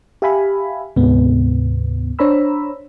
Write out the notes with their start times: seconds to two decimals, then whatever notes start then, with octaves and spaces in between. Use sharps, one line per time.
0.22 G4 E5 F5 G#5 B5
0.96 D2 G#2 C3 B3
2.19 D4 C5 C#5 A#5 B5 E6